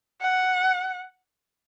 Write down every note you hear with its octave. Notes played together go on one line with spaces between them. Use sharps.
F#5